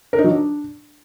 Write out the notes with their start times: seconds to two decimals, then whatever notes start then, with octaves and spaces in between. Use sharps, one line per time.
0.13 A#4
0.19 D#4
0.24 F#3
0.30 D4